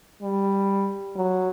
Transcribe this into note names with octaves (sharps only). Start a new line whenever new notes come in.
G3
F#3